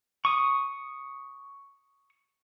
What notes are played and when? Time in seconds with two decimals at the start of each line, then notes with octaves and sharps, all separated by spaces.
0.25 C#6 D#6